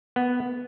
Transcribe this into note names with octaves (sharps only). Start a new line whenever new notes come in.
B3